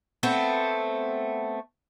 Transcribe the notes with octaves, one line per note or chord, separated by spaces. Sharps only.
A3 B3 C4